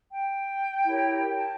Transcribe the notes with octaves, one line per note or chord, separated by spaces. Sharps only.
G5
E4 G4 A#4 C#5
A5